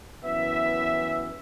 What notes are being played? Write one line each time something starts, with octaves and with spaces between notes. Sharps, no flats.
F#2 E3 B3 E5